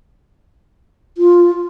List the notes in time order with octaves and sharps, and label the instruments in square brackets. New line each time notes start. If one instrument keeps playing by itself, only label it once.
[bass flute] F4